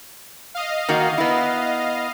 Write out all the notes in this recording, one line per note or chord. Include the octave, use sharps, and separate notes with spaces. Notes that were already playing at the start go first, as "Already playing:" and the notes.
D#5 F5
D#3 A#3 F#4
B3 E4